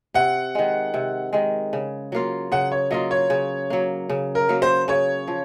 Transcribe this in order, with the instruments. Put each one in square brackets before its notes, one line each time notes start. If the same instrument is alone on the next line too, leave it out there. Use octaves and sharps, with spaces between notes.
[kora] C3 [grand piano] F#5
[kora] D#3 G#3
C3
D#3 G#3
C#3
F#3 A#3 F4
[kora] C#3 [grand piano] F#5
[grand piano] C#5
[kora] F#3 A#3 F4 [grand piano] D#5
[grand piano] C#5
[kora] C#3
F#3 A#3
C#3
[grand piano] A#4
[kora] F#3 A#3
[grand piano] C5
[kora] C#3 [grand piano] C#5
[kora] F3